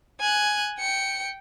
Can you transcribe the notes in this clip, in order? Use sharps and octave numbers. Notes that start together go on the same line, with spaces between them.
G#5 F#6
G5 C#7